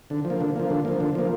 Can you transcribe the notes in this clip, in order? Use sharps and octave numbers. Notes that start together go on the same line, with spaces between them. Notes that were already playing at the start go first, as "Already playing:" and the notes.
D3
F3
A#3
D3
F3 A#3
D3
F3 A#3
D3
F3 A#3